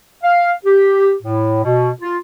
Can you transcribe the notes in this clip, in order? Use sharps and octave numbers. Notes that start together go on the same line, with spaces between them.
F5
G4
A2
B2
F4